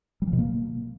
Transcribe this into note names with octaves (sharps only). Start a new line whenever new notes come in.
G3
F3
B2
A#3